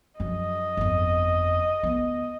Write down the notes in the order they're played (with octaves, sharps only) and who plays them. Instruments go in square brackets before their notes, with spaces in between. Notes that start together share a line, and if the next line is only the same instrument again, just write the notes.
[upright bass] F#2 F3 [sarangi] D#5
[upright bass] G1 F2
D2 B3